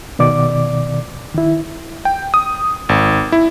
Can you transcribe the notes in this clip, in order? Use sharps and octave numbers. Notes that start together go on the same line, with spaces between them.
B2 D#3 D5 D6
D#3 E4
G5
D#6
G#1
E4